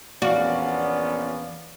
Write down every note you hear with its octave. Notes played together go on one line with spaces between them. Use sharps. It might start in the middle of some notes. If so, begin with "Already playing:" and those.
A#1 E2 B3 C#4 F#4 D5 F5